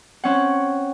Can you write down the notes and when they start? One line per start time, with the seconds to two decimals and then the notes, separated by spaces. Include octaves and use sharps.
0.24 C4 C#4 F#5